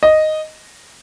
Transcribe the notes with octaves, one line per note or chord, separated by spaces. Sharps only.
D#5